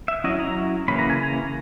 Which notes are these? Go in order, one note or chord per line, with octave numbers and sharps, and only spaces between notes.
E5
F#3 C#4 E4 D#5
A#5
C#3 E3 A#3 C#4 B5
A#5
G#5
A#5